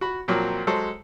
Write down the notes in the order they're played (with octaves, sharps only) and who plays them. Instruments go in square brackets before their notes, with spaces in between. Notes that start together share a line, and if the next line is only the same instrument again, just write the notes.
[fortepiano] F#4 B5
A#2 F3 F#3 A#3 C4
F#3 G#3 A4 C5 C#5